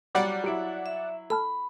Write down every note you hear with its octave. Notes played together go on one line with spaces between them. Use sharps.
F#3 G3 D5 F#5
F#3 E4 G4 D7
E5
A4 A5 B5 F6